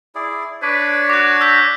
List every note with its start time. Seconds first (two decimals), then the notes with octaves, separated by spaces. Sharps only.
0.15 E4 G#4 D5
0.62 D4 B4 C#5 D5
1.10 F#4 D6 F#6
1.41 E6 G6 B6